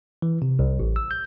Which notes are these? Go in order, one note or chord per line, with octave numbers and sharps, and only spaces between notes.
E3
C3
C2
A1
E6
G6